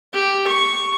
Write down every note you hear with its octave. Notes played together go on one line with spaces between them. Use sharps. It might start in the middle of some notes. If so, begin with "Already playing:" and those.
G4
C#6